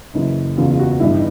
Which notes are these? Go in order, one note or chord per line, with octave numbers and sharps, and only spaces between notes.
F#1 F#2 C#3 E3
E1 E2 C#3 F4
F4
F#4
A1 G2 D3 E4
D#4